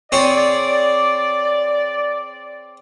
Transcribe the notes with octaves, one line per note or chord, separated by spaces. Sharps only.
C4 G#4 C#5 D5